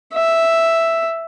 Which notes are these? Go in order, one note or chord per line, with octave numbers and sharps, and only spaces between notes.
E5